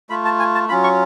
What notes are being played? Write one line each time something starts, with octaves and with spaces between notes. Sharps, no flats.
A3 F4 B5
A5
G#5
A5
F#3 C#4 F4 B5
C#6